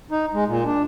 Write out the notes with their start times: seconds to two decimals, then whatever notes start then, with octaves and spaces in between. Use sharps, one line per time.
0.11 D#4
0.34 G#3
0.48 A#2
0.65 D4